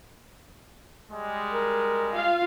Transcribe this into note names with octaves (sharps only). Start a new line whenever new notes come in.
G3 G#3
A#4
F4 F5